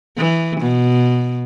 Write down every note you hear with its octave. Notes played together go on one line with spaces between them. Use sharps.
E3
B2